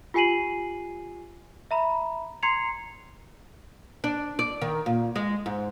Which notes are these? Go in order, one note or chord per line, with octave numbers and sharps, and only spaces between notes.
F4 G4 G#5 C7 D#7 F#7
E5 A#5 B5
A#5 C6 G#6 C7 C#7 F7
D4
D5
D#3
A#2
G#3
G#2